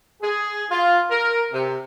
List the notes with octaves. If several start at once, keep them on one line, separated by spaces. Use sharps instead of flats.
G#4
F4
A#4
C3